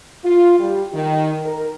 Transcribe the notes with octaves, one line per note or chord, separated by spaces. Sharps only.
F4
G3
D#3
A#4